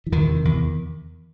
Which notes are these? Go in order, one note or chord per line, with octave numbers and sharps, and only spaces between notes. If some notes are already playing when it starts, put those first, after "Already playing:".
E3
E2 D#3
C3
E2